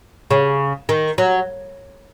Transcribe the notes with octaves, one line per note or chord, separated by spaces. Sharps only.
C#3
D#3
F#3